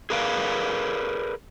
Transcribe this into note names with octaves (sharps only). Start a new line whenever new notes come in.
G#4 A#4 B4 D5 F5